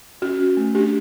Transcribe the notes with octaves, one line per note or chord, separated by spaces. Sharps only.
C#4 F#4
C#4
A3
D4 G4